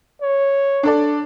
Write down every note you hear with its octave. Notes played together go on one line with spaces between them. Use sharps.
C#5
D4 A4 D5